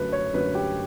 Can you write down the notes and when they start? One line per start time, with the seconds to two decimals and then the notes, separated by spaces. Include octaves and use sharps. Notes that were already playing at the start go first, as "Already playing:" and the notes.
Already playing: F#2 D3 F#3 A3 B4
0.12 C#5
0.34 F#2 D3 F#3 A3 B4
0.55 G4